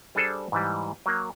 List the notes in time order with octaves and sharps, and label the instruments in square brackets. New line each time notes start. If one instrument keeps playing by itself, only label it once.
[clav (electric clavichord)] G3 D4 G#4 A4 C5
G#2 E3 G3
F#3 A#3